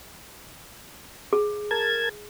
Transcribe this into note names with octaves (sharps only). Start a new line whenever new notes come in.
G#4
A#4 A5 G#6